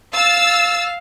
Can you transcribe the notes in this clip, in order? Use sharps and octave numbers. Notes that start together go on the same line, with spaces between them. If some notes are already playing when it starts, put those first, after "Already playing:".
F5 E6 A6